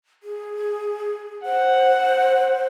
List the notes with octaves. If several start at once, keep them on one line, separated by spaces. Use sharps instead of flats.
G#4
C5 F#5